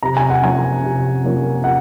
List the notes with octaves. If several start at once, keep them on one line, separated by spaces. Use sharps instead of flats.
C3 A#5
G#5
F#5
F3 A#3 C#4 G#5
C3
F3 A#3 C#4
C3 F#5